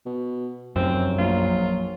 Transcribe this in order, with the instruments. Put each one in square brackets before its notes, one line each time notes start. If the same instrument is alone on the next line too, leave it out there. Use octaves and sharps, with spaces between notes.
[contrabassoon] B2
[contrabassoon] F1 [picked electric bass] F#2 [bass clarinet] F#3 [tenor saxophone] C4
[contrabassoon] A#1 [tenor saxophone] F4